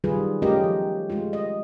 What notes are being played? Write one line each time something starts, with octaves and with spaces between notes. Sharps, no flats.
D#3 F#3 G3 F4 G#4 B4
A3 C#4 F4 G4 A#4 D#5
F3
G#3 A3 F4
D#5